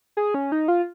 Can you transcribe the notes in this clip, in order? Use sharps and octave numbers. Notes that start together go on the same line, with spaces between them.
G#4
C#4
D#4
F4